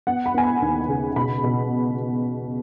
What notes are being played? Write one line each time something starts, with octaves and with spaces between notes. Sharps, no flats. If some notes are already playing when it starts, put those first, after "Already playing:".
B3 F#5
B5
B3 G#5
B5
D#2
C#3
B2 B5
B2